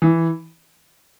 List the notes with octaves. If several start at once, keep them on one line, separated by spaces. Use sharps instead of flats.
E3